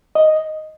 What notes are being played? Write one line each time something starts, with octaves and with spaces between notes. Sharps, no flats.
D#5